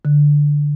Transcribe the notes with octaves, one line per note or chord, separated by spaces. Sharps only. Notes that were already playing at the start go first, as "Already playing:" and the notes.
D3